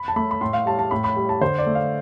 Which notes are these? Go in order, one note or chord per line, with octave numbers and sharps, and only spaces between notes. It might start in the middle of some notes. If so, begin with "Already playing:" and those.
Already playing: B5
A5
A3 B5
B5
A2 C6
F5
G3 A5
A5
A2 B5
B5
G3
A5
D3 C5
D5
A3
F5